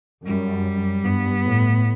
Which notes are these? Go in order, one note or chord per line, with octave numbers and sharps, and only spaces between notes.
F#2 G3
G2 B3
A2